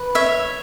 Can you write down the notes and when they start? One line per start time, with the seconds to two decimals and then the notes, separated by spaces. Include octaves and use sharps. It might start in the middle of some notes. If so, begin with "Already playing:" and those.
Already playing: B4
0.15 C#5 E5